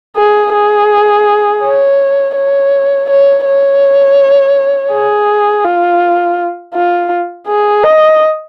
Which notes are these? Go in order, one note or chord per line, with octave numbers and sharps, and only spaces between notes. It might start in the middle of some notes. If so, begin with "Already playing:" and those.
G#4
G#4
C#5
C#5
C#5
C#5
G#4
F4
F4
G#4
D#5